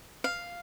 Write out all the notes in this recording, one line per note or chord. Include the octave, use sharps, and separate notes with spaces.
F5